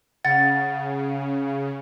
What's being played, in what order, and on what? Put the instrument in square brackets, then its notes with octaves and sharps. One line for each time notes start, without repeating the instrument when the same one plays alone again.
[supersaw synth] C#3 [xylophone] F#5 A6